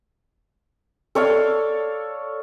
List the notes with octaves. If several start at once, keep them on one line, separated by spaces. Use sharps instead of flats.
A4 C#5 D5 F5